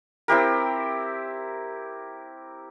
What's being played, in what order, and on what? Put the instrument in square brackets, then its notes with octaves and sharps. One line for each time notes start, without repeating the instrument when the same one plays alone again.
[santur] C4 E4 G4 A#4